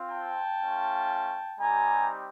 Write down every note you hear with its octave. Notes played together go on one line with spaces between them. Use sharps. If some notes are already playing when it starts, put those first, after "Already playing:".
Already playing: C4 F4
G5 A5
A3 C#4 F4
G3 C4 D#4 G4 G#5 A#5